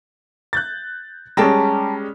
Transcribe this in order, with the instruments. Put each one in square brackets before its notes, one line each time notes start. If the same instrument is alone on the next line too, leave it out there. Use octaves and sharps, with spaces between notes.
[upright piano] F#6 G6 A6
[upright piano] G3 G#3 C#4 [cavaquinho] G5 A5 A#5